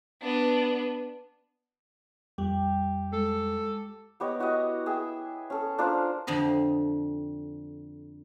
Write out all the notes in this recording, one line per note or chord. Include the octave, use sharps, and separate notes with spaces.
B3 D4
F2 G3 G4
G#3 A4
B3 G4 C#5 D#5
E4 F#4 G4 D#5
G#4 E5 G5
C#4 G#4 A4
D4 F4 A#4 C5
F2 D3 C5 D#5